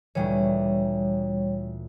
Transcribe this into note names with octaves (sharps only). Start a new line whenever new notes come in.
D2 A#2 E3 G3 C#5